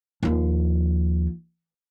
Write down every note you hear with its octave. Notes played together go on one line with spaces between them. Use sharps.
D#2 F3